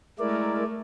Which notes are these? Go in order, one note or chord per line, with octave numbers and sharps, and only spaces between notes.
G#3 A3 E4 A#4 D5